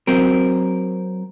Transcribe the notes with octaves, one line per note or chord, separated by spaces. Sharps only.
F#3 C4 A#4